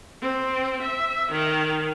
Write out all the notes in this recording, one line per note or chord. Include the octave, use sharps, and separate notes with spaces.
C4
E5
D#3